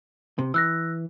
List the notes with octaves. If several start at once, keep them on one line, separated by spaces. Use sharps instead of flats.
C3
E3 E6 F#6 A#6